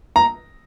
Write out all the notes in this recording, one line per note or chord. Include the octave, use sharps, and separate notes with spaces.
A#5